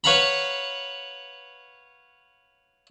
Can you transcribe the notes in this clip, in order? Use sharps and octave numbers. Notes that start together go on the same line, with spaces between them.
B4 C#5 F5 F#5 A#5 B5